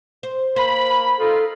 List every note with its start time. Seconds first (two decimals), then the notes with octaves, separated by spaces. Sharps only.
0.23 C5
0.56 A#3 C5 B5
1.19 D#4 F4 A4